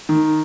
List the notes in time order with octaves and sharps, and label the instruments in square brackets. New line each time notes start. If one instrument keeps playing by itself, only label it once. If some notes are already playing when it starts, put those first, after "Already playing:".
[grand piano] D#3